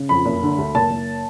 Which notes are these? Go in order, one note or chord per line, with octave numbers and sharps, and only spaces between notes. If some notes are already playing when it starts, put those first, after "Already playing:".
Already playing: C#3
F2 B5
F#1
D3
D2
F#1 A5
F#1